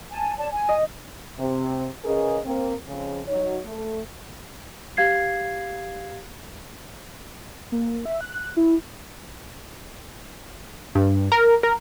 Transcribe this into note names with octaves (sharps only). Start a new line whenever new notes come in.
G#5 A5
C#5 D5 A5
G#5
D#5
C3
C#3 C#4 G#4 A#4 B4 D#5
A#3 C4
F2 C#3
F#3 D#4 F#4 C#5
A3
G4 F5 G#6 C7
A#3
E5
F#6
E4
G2
A#4
A#4